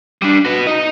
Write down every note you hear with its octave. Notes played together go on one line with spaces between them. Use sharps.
G3 D4
F#4 B4
D#4 D#5